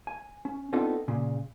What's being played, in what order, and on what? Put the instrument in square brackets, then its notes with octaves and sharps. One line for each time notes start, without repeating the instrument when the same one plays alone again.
[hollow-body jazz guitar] G#5
C#4
B3 C4 D4 D#4 F4 A4
A#2 C#3